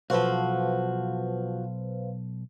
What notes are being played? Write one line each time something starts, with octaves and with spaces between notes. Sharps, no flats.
B1 F3 F#4 A4 B4 C5 F5